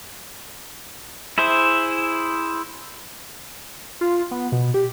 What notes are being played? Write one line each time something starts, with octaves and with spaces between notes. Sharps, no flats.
E4 G#4 C5 E5
F4
B3
B2
G4